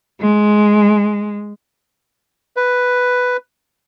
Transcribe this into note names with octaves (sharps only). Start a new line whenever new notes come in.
G#3
B4